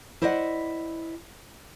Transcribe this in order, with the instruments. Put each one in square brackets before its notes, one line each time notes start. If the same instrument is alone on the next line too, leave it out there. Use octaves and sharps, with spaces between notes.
[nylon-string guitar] E4 C5 D5 D#5 F5 F#5